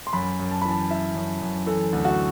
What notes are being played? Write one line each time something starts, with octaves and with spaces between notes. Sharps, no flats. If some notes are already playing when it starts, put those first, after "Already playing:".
C6
F#2 B5
F#2
A5
E3 B5
A5
E3 E5
F#2
F#2
E3 A4
D2
F#4